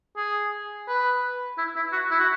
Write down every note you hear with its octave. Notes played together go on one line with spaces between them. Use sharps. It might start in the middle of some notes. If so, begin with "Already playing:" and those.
G#4
B4
E4
E4
F#4
E4
F#4